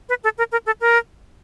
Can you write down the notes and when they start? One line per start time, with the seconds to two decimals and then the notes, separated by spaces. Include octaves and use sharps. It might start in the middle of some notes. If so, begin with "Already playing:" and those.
0.09 B4
0.24 A4
0.38 A#4
0.52 A#4
0.66 A4
0.81 A#4